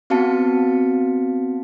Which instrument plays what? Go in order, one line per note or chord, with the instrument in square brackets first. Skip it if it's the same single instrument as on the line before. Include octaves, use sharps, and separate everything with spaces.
[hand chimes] B3 C4 F#4 F5 A5 C#7